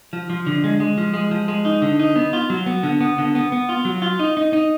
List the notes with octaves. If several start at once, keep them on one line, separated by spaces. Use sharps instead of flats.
F3
F3
D3
G#3
G#3
F3
G#3
F3
G#3
D#4
D3
D#4
B3
F4
F#3
B3
D3
B3
D3
B3
B3
F4
F#3
F4
D#4
D#4
D#4